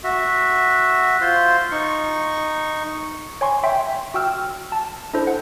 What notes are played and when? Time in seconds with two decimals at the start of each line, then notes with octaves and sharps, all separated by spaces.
0.04 F#4 E5
1.21 F4 C5 C6
1.72 D#4 C#6
3.41 C#5 G#5 C6 C#6
3.64 E5 G5 C6
4.14 F#4 G5 E6 F6
4.72 A5
5.13 D4 E4 A4 C5
5.27 F#5